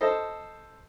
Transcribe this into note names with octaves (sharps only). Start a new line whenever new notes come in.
A4 C5 D#5